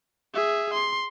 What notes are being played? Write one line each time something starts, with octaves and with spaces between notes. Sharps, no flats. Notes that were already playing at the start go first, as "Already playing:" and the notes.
G#4 E5
C6